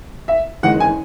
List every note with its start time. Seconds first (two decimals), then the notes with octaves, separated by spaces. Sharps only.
0.28 E5
0.63 F#1 E2 D#3 G#3 F#5
0.80 G#5